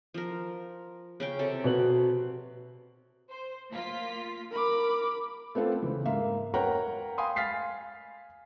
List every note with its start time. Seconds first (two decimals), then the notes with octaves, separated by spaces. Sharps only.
0.14 F3 A#4
1.20 C#3 C#4 G5
1.39 C3 A4
1.64 B2 B3 F#7
3.29 C5
3.71 A#3 F4 B6
4.51 A#4 B5 D6
5.55 A3 B3 C4 F4 A4
5.82 C#3 E3
6.05 G#2 A#3 E5 F5
6.54 A#4 B4 C#5 F#5 G5 A#5
7.18 F5 G5 G#5 B5 C6 D#6
7.36 F5 G#5 F6 A6 B6 C7